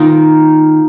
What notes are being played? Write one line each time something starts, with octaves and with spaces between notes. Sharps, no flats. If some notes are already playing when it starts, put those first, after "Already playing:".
Already playing: D#3 A#3 D#4 F4